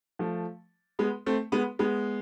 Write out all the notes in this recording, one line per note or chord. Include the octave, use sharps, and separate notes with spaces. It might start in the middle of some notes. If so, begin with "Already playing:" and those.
F3 A3
G#3 B3
A3 C4
G#3 B3
G#3 B3